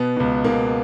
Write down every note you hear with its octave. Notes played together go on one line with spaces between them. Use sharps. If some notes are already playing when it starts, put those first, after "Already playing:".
Already playing: B2 B3
C#2 B2
C#2 B2 A#3